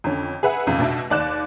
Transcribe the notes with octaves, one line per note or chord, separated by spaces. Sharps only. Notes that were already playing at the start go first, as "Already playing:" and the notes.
F2 D3 C#4
G#4 B4 E5 F#5
B1 F2 C#3
B2 D4 E5
D#2 D5 F#6 E7